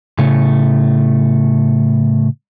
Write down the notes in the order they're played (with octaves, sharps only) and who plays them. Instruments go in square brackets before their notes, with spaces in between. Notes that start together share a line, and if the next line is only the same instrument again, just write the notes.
[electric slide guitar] A2 C#3 A3